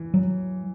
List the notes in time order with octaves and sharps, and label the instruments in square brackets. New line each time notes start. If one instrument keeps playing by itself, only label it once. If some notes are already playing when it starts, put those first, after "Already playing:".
Already playing: [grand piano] E3
[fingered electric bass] F#3